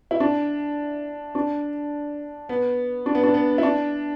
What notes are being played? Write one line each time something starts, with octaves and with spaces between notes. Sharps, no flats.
E4
D4
D4
B3
D4
B3
D4
B3
E4
D4